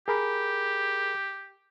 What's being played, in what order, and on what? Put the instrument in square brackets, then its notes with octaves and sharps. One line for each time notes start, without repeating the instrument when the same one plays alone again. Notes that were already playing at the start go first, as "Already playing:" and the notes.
[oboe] G4 [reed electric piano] G#4 A#4 B5